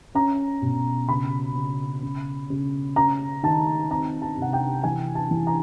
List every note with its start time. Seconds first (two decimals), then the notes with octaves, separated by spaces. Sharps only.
0.15 C#4 A#5
0.62 B2
1.08 C#3 B5
1.56 C#3
2.03 C#3
2.50 C#3
2.96 C#4 A#5
3.43 D#3 A5
3.90 C4 A#5
4.22 A5
4.37 C3 F#5
4.53 G5
4.84 E3 G#5
5.15 A5
5.31 E3
5.47 A#5